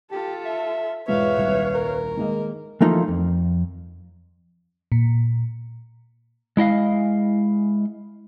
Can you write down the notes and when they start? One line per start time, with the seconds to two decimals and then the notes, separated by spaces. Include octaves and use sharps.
0.11 F4 G4 A4
0.45 E5
1.08 E1 G#2 F4 B4 C#5 E5 F5
1.37 D#1 C2
1.75 A#4
2.17 D#3 G#3 A#3 D#5
2.81 E3 F3 A3 A#3 D#4 F4
3.08 F2
4.92 A#2
6.57 G#3 E4 D#5 F5